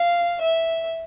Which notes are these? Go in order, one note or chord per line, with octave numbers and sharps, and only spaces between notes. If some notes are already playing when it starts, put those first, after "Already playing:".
Already playing: F5
E5